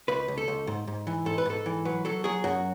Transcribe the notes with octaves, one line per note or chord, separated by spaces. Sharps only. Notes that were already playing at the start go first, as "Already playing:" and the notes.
C#2 B4
C#2
A4
C#2
G#2
G#2
E3
G#2 A4
B4
G#2 A4
E3
F#3 B4
F#3 A4
F#3 G#4
F#2 F#4